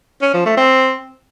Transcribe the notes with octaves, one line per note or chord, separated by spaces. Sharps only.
C#4
F3
A3
C4